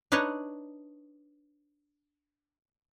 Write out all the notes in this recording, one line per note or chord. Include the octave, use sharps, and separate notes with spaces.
D4 D#4 B4 C#5 D#5